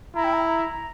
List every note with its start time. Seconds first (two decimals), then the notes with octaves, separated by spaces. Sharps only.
0.15 E4 A#5
0.24 G5
0.33 A#5